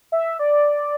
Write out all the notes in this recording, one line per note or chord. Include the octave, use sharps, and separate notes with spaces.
E5
D5